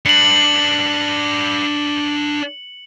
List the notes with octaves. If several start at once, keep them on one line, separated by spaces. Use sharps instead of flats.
D4 B4 C#7 F#7